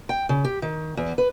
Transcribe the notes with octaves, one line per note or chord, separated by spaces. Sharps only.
G5
C#3
G4
D#3
E2
B4